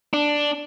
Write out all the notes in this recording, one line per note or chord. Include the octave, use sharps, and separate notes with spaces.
D4